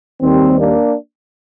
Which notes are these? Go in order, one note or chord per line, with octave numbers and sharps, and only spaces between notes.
D#2 D#3 G3 C4
A#3 D4